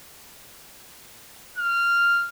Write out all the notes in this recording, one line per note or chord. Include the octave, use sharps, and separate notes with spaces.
F6